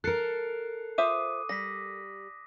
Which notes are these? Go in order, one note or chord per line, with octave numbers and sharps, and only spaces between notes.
A4 A#4 F#6 C7 C#7
F4 C5 E5 D6 D#6 D#7
G3 A#6 B6